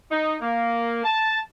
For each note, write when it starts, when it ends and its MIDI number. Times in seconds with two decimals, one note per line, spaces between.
0.11 0.36 63
0.40 1.03 58
1.04 1.40 81